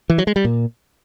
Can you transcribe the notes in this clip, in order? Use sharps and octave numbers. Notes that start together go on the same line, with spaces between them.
E3
F#3
G#3
G3
A#2